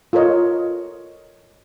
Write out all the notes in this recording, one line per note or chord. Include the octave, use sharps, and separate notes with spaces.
F4 A4 A#4 C#5 D#5